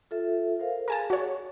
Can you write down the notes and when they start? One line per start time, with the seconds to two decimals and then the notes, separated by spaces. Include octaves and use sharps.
0.11 F4 A4 E5
0.59 A#4 C5 F5
0.88 G#4 A#4 G#5 A5
1.10 F#4 C#5